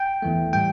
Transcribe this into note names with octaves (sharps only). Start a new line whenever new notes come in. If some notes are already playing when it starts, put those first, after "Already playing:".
Already playing: G5
E2 E3 A3
A2 E3 G3 G5